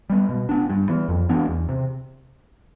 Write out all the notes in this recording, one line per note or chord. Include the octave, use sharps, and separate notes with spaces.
G3 B3
B2
B3 D4
G2
E3 B3
F2
E3 B3 D4
E2
C3